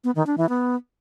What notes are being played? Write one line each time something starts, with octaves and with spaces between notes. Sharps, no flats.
B3
D#3
D4
E3
B3